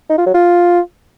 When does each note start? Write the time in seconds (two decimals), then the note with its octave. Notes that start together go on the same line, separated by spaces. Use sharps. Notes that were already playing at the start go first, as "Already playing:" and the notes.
0.09 D#4
0.18 F4
0.26 F#3
0.34 F4